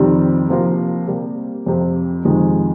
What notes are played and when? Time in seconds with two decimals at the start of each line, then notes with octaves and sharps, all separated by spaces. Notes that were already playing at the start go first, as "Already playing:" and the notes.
Already playing: F2 C3 D#3 G3 C4
0.50 C3 F3 A#3 F4 A#4
1.08 C3 G3 A#3
1.66 F2 C3 F3
2.25 F2 C3 D#3 G#3